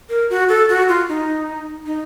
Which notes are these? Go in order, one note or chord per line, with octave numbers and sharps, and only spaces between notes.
A#4
F#4
A4
F#4
F4
D#4
D#4